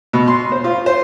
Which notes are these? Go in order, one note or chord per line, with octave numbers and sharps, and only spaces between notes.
B2
C6
C5
F4
C5